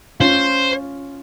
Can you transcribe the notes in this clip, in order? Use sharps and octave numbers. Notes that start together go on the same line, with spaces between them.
C#4 F4 C5